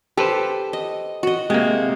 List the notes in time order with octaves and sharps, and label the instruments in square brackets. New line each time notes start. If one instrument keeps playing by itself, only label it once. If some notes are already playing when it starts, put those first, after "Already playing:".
[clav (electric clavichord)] G4 B4 C5 [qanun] A4
[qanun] D#5
F#4 D#5
[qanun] C3 [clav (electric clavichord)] G#3 A#3